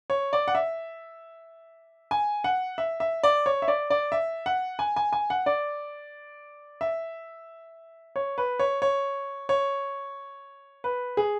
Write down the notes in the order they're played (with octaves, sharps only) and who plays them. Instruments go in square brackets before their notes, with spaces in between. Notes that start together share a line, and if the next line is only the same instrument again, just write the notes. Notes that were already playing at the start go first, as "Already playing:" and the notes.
[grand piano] C#5
D5
F#5
E5
G#5
F#5
E5
E5
D5
C#5
E5
D5
D5
E5
F#5
G#5
G#5
G#5
F#5
D5
E5
C#5
B4
C#5
C#5
C#5
B4
G#4